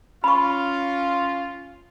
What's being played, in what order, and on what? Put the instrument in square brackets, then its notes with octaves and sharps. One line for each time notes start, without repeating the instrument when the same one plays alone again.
[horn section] C#4 F4 [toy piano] B5 C#6